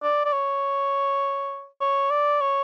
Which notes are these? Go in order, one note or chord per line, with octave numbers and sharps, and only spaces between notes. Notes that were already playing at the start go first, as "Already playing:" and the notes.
D5
D5
C#5
C#5
D5
C#5